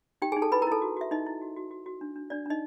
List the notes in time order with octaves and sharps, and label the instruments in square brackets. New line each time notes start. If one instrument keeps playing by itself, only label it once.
[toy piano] D#4 G4 G5
G#4 G#5
D#4
A4 A5
E4 B4 B5
A#4 A#5
E4 A4 A5
F#4
F#4 E5
D#4 E4 D#5
E4
F#4
F#4
F#4
F#4
D4
D4
D4 D5
D4 D#4 D#5